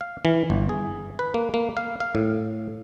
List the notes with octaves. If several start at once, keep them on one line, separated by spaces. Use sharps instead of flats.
F5
E3
G1
G#4
B4
A#3
A#3
F5
F5
A2